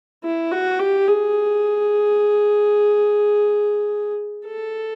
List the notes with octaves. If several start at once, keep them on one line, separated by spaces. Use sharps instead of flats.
E4
F#4
G4
G#4
A4